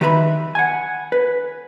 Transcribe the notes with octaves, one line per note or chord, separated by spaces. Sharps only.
D#3 G4 B4 E5 A#5 B5
F#5 G#5
B4